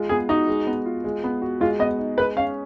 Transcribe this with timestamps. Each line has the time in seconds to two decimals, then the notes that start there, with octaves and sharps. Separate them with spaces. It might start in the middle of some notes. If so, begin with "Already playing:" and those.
Already playing: G#3 F4
0.09 B3 G#4
0.29 D#4 F#4
0.48 G#3
0.67 B3
0.85 F4
1.04 G#3
1.24 B3
1.42 F#4
1.60 G#3 F4
1.79 B3 D#5
1.98 D#4
2.18 G#3 B4
2.37 C#4 F5